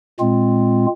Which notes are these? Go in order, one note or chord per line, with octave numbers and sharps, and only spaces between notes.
A#2 G#3 C4 F4